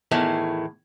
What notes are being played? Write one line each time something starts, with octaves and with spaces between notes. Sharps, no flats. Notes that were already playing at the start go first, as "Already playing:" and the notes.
E2 A2 D#3